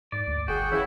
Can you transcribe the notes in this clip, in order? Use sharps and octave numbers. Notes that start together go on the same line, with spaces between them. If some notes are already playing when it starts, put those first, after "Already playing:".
G#2 D5
D2
G1 F#4 G#4 G5
C#3 E3 E4